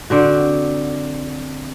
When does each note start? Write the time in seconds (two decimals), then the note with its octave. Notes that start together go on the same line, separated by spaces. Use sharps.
0.10 D3 C4 F#4